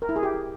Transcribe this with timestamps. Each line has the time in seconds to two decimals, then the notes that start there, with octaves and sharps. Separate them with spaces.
0.02 A#4
0.09 E4
0.16 G#4
0.23 G4